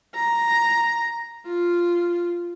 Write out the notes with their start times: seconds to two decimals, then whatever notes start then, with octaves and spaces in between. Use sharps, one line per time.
0.16 A#5
1.47 F4